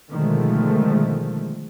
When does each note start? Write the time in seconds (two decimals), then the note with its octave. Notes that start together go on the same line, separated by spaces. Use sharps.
0.12 B2 D3 D#3 F3 G#3 A3